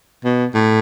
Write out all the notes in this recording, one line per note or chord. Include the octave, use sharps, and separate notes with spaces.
B2
A2